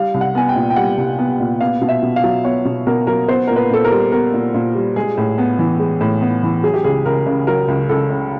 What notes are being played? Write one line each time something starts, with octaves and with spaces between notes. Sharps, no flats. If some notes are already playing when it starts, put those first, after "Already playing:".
Already playing: G3 F5
C2
F#5
B3 G#5
G5
A#2
G5
G3 F#5
C2
B3
A#2
B3 F5
B2
E5
B2
F5
F#3
B3 C#5
B2
B2 A#4
F#3 A#4
B3 C5
A#2 A#4
B4
A#2 A4
A#4
G3
B3 A#4
A#2
A#2
G3
G#3 G#4
A2
B3
E3
G#3
A2
B3
E3
F#3 G#4
G4
C#2 G#4
C#2 A#4
C#3
F#3 A#4
C#2
C#2 A4
C#3